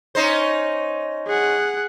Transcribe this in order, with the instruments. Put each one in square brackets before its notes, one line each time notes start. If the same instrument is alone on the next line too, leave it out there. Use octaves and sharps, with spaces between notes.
[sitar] C#4 D#4 C5
[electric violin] G#4 F#5